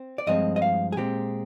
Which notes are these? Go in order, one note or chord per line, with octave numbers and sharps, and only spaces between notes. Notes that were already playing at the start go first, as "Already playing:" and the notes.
Already playing: C4
D5
G2 F3 G#3 C4 D#5
D#5
F5
G#4
A#2 G#3 C4 G4